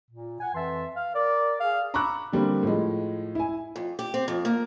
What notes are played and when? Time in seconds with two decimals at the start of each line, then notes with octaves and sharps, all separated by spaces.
0.11 A#2
0.41 F#5 G#5
0.55 F2 E3 E5 A5 C6
0.95 F5
1.14 A#4 D5
1.60 G#4 F5
1.94 A#5 B5 C#6 D6 E6 F#6
2.32 D3 G3 A#3 C4
2.63 A2 F3 G#3
3.35 E4 G#5
3.76 F2
3.99 G4
4.14 C4
4.28 F2
4.45 A#3